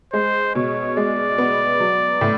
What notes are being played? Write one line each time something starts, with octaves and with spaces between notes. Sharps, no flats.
G#3 C5
B2 C#5
G#3 D5
B3
F#3
A2